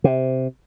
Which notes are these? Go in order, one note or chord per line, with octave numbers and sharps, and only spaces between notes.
C3